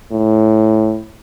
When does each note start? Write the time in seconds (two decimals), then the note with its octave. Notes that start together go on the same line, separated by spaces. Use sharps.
0.12 A2